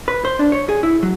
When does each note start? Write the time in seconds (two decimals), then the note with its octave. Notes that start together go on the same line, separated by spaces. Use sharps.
0.08 B4
0.25 C5
0.39 D4
0.52 C#5
0.69 G#4
0.83 E4
1.03 F#3